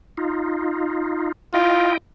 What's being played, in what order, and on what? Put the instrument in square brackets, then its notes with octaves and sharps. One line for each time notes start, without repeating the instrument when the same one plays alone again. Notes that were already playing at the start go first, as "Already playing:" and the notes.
[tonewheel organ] D#4 F4
[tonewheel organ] E4 D#5 G5 [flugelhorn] F4